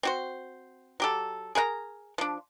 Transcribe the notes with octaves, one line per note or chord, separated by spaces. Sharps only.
C4 F#4 C5
F#3 G4 A4
G#4 A#4 F#5 A#5
F3 D4